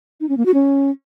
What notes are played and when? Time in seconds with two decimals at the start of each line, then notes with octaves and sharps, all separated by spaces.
0.21 D#4
0.29 C#4
0.37 A#3
0.46 F#4
0.54 C#4